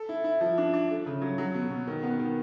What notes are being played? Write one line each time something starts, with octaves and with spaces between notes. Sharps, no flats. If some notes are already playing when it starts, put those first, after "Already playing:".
Already playing: A4
E4
E4
F3
D4
D4
A3
C#3
F#3
F#3
B2
B2
D#3
B3
D#3